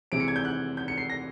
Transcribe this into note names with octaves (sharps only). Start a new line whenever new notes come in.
C3 E3 G#3 C4 D7
C#7
G#6
G6
F#6
G6
C#7
C7
A#6